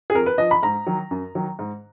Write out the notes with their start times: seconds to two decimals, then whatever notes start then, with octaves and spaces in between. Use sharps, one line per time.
0.10 G#4
0.14 F2 A#4
0.26 B4
0.38 F3 D#5
0.51 B5
0.63 G#2 A#5
0.87 D#3 F#3
1.11 F#2
1.35 D#3 F#3
1.59 G#2